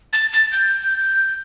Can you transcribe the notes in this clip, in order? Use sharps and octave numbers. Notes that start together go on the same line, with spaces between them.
A6
A6
G6